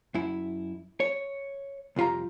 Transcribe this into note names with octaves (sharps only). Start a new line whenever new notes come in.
F#2 E4
C#5
C2 F2 F4 G4 A#5